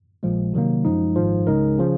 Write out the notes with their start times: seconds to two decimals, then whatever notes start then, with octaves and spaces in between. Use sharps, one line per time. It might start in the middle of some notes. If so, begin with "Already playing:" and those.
0.23 A#1 A#2 F3 G#3
0.53 C3 D#3 F#3 A#3
0.85 F#2 F3 G#3 D#4
1.15 G#1 G#2 F3
1.47 C#2 C#3 G#3 D#4 A#4
1.78 C#3 F3